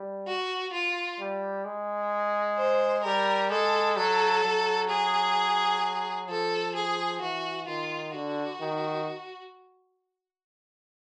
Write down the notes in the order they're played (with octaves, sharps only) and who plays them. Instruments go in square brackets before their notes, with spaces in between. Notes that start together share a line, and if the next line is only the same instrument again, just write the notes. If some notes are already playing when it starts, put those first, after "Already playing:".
Already playing: [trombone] G3
[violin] F#4
F4
[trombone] G3
G#3
[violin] C5
[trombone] G3 [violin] A#4
[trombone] G#3 [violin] A4
[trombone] F#3 [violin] A4
[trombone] F#3
[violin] G#4
[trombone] F3 [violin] A4
[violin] G#4
[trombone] E3 [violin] F#4
[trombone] D#3 [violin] F4
[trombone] D3 [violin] F#4
[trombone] D#3